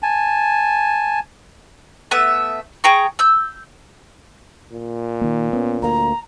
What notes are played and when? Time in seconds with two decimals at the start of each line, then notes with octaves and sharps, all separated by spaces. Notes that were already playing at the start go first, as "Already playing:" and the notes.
0.03 G#5 A5
2.11 A3 B3 E5
2.84 G#4 G5 A#5 C#6
3.19 E6 G6
4.72 A#2
5.21 D#3 A#3
5.53 B3 C#4
5.82 D2 A#3 A#5